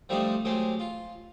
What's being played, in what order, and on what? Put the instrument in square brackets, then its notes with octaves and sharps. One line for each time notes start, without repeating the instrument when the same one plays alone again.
[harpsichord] F3 G3 A3 C4 D4 D#4
F#3 G#3 A3 C4 G4
F4